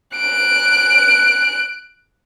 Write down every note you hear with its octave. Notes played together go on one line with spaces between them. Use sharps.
F#6 D7